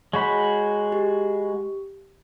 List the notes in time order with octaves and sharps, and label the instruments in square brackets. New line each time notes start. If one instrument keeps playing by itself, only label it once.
[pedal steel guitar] G#3 F#4 B5 [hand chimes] C#5
[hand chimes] G4